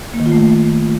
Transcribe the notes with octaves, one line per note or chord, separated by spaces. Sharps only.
A#3
D#3
F4
A3